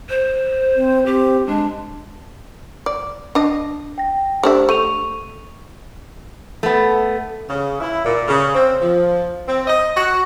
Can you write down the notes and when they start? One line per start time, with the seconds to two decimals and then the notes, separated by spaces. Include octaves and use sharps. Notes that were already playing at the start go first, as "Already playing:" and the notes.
0.09 C5
0.76 C4
1.06 C4 G4
1.47 G#3 D4
2.86 D5
3.35 D4 D#5
3.98 G5 A#6
4.43 A3 D4 G4 C5 E5
4.69 A3 C#6 D#7 F7
6.63 A3 B3
7.50 C#3
7.80 E4
8.05 A#2
8.28 C#3
8.54 C4
8.82 F3
9.48 C4
9.68 D#5
9.97 F#4